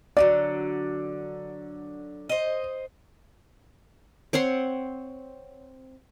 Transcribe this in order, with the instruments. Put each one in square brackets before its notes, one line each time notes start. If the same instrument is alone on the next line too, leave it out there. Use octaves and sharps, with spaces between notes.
[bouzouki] D3 E3 F#3 [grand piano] D5
[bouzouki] C5 D#5
[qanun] C4 C#5 F#5 C6